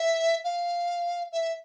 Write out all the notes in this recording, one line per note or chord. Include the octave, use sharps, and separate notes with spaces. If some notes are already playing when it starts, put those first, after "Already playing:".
Already playing: E5
F5
E5